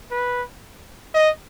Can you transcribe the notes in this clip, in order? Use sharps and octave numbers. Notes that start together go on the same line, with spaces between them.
B4
D#5